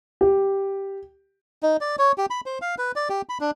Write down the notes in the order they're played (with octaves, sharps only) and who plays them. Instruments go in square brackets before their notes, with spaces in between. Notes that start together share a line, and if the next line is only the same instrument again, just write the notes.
[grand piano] G4
[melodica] D#4
D5
C#5
G4
B5
C5
F5
B4
D5
G4
B5
D4